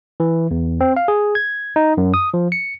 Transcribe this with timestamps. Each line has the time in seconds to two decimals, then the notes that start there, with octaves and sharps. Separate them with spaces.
0.20 E3
0.51 E2
0.81 C4
0.96 F5
1.08 G#4
1.35 G#6
1.76 D#4
1.97 F#2
2.14 D#6
2.34 F3
2.52 C#7